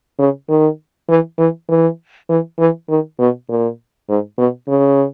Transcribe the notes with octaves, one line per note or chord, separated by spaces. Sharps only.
C#3
D#3
E3
E3
E3
E3
E3
D#3
B2
A#2
G#2
B2
C#3